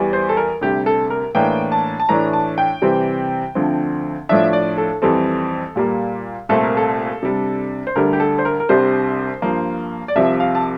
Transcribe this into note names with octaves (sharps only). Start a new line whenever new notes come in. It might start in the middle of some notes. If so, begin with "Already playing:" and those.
Already playing: E2 E3 G3
C5
A4
A#4
D2 C3 G3 G4
A4
A#4
A2 E3 A#3 D4 G5
A5
A5
A2 E3 A3 D4 A#5
A5
G5
C3 E3 G3 C4
D2 D3 F3 C4
A2 F3 A3 D4 E5
D5
A4
F2 E3 G3 C4 A4
A#2 G3 A#3
C2 A#2 A3 C4 A4
A#4
A4
C3 G3 D4
C5
D2 D3 G3 A#4
G4
A4
C5
A#4
A#4
C2 C3 G3 D4 C5
G2 F3 A#3
D5
C2 C3 F3 E5
F5
A5